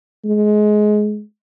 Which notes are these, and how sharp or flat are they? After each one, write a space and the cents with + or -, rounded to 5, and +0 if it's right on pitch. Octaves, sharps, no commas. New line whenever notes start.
G#3 +20